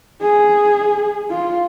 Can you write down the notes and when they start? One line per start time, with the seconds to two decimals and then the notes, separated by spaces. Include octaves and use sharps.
0.21 G#4
1.31 F4